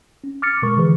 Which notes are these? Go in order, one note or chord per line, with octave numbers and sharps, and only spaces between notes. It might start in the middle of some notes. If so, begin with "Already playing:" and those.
C#4
D6 F6 A6 C#7
B2 G#3 A#4 C#6
D3 E3 G#4 B4